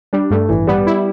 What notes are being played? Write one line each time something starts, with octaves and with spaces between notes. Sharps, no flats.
G3 D4
G2 A3
A1 E3
G3 B3
E4